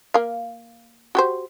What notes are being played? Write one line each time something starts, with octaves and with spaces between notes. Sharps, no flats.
A#3 F5
F#4 G4 C5